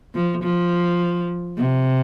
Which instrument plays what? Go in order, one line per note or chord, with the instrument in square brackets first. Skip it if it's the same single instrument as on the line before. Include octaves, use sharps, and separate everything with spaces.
[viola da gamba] F3
F3
C3